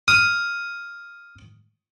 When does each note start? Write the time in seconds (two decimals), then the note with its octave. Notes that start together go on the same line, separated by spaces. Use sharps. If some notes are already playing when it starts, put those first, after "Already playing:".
0.08 D#6 F6